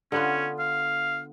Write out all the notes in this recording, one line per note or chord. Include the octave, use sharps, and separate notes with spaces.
D3 B3 C#4 F4
F5